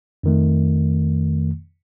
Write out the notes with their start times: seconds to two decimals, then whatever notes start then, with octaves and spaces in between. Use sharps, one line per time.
0.23 F2 D#3 A3